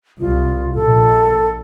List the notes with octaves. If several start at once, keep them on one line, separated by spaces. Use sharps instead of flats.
C2 F4
A#1 A4